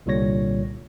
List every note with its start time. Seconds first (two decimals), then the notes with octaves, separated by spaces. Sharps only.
0.06 C2 A#2 D3 G3 C#5 A#6